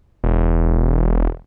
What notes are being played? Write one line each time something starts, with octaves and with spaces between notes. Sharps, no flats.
E1